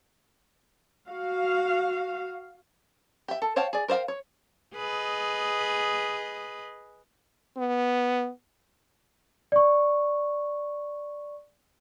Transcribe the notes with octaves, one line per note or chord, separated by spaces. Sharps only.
F#4 F5
G4 E5
A4
C5 C#5 F5 G5 A5
G#4 D5
A#4 C5 C#5 F5 G5
C#5
G#4 B4 D#5
B3
D5 C#6